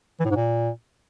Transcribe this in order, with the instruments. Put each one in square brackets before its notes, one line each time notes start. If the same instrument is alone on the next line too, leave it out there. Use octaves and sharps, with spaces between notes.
[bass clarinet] E3
A2
G#2
A#2